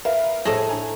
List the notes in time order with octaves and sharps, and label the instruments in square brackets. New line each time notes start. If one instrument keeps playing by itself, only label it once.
[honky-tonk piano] A#4 B4 F5 [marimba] E5
[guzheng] A2 A3 D#5 [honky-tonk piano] G#4 A4 C5
[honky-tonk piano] D4 G#5 A#5